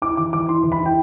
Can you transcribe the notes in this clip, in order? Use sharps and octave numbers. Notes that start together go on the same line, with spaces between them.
E4 D6
E3 D6
E3 D6
E4 C6
E3
B5
E4
G5